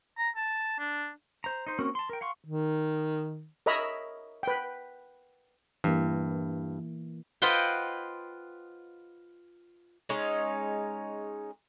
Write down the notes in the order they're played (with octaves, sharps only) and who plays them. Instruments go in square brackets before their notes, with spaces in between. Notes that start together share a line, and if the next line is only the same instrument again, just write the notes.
[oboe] A#5
A5
D4
[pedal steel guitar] C5 A#5
D#4 C5
A#3 C4 C#4 F#4 A#4
A5 C6
A#4 G5
F5 F#5 C6 C#6
[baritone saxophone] D#3
[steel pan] A#4 C#5 D#5 E5 A#5 B5
B4 G5
[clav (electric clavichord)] G2 [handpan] E3 A#3
[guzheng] F4 B4 C5 D#5 F#5 G5
[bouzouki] G#3 C#4 D#4